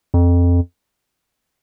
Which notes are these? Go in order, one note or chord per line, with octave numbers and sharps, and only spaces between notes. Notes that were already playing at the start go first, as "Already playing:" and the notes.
F2